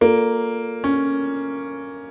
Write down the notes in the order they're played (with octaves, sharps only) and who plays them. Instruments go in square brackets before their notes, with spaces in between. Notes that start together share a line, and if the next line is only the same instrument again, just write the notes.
[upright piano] A#3 [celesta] F4 A4 D5
[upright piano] C#4